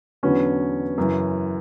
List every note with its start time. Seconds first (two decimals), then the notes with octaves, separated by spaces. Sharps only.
0.23 E2 D3 F#3 B3 C#4
0.98 F#2 C#3 E3